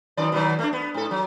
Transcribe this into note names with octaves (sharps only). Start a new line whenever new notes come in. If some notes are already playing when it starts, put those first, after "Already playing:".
F#2 D#3 D5
B2 D#3 F#3
A3 D4
B3
G#2 A4
F#3